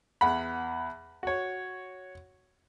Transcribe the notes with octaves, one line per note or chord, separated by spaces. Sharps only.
E2 F#5 B5
F#4 C#5